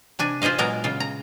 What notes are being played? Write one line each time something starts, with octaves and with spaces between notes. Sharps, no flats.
C3 D4 G#5
F4 G#4 C5 D#5 F5
A#2 F#3 G#3 B3 A#4 A#5
C#3 F4
A#5